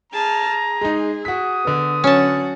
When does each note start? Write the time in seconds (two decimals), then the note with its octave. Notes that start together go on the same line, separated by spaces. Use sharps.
0.12 G#4 A5 A#5 F6
0.48 G#4
0.81 G#3 D#4
1.25 F#4 D#6 B6
1.65 D3 B3
2.04 F#3 C#4 F#4 A5